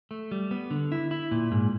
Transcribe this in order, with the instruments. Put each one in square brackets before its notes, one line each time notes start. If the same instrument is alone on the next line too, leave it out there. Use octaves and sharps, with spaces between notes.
[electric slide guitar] A3
G3
B3
D3
E4
E4
A#2
G#2